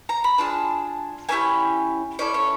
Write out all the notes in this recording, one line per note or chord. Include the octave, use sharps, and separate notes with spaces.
A#5
B5
D4 F4 G#4 A5
A#3 C#4 E4 G4 G#5
C#4 E4 A4 D5
C#5